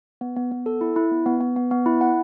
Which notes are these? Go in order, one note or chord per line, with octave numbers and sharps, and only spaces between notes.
B3
B3
B3
A4
E4
E4
B3
B3
B3
B3
B3
E4
F#5